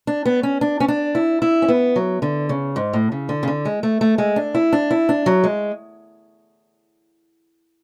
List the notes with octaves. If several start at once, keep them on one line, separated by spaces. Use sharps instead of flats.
D4
B3
C#4
D4
C#4
D4
E4
E4
C#4
B3
F#3
D3
C#3
G#2
A2
C#3
D3
C#3
D3
G#3
A3
A3
G#3
D4
E4
D4
E4
D4
F#3
G#3